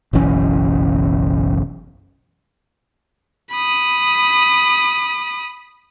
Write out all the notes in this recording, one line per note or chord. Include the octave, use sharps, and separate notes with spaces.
F#1 B1 E3 C#4
B5 D#6